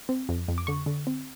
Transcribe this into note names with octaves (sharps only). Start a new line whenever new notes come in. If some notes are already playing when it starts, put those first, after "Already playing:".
C4
F2
F2
D6
D3 C#6
D3
C4